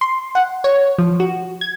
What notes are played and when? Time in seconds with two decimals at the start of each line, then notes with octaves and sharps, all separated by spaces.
0.01 C6
0.35 F#5
0.64 C#5
0.98 F3
1.20 F#4
1.61 G#6